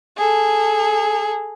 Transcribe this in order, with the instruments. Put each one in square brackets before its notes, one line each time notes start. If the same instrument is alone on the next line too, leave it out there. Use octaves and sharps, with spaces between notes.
[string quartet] G#4 A4